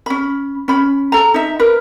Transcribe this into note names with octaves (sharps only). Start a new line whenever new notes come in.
C#4 B5
C#4 B5
A4 A#5
D#4 E5
A#4 B4